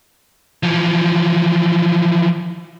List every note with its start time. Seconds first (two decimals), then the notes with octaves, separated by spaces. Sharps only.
0.63 E3 F3